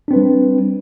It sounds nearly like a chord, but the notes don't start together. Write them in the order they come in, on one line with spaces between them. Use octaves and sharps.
D4 C4 B4 G3